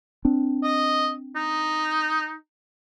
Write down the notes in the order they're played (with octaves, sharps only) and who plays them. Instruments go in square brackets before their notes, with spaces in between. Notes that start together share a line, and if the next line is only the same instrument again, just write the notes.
[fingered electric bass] C4 D4
[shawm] D#5
D#4